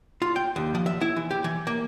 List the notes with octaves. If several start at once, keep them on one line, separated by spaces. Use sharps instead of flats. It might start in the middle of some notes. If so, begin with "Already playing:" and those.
F4
G5
D#2
F3
E5
E4
E3
G4
E3
A#3